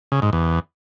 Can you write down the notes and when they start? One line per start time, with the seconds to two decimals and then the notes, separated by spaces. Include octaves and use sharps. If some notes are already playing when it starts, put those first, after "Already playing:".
0.12 C#3
0.22 G#2
0.33 E2